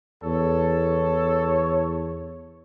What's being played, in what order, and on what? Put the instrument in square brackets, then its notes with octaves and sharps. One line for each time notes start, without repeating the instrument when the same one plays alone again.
[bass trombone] E2 [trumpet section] A4 [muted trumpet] C#5